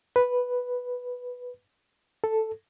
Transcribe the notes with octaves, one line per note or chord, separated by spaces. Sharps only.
B4
A4